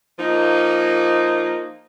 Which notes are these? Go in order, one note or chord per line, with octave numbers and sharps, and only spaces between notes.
F3 A#3 D#4